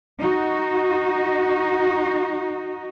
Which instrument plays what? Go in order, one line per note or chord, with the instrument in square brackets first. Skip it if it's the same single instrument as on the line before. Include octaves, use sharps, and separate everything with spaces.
[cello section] D#4 F#4